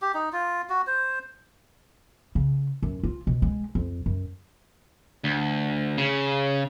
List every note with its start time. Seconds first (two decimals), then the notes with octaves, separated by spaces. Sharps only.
0.02 G4
0.14 D#4
0.33 F4
0.69 F#4
0.87 C5
2.35 C#3
2.82 F#2
3.03 F4
3.27 B2
3.42 G#3
3.75 F2
4.06 F#2
5.24 D2
5.98 C#3